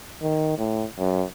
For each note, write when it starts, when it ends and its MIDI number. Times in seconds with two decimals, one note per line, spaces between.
0.23 0.57 51
0.58 0.85 45
0.99 1.23 42